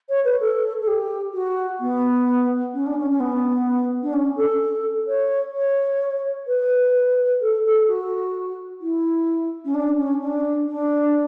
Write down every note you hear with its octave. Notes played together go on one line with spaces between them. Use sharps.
C#5
B4
A4
A4
G4
F#4
B3
C#4
D4
C#4
C#4
B3
D4
C#4
A4
C#5
C#5
B4
A4
A4
F#4
E4
C#4
D4
C#4
D4
D4